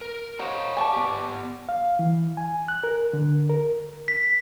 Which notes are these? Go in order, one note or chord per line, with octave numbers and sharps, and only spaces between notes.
A#4
C5 C#5 D#5 F5 F#5 A#5
D5 G#5 A5 C#6
B3 G4
F5
E3
G#5
F#6
A#4
D3
A#4
B6